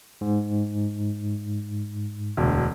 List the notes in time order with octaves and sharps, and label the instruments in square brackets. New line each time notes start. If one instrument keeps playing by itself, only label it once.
[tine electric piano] G#2
[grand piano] E1 D2